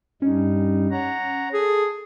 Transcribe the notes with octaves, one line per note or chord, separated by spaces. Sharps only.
G2 G3 C#4 D#4
C#5 F#5 A#5
G#4 A4